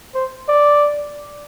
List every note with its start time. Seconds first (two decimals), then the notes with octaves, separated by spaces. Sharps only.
0.15 C5
0.48 D5